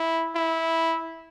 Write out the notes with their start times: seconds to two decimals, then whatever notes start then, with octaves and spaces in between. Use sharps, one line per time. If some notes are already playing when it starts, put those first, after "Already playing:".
Already playing: E4
0.35 E4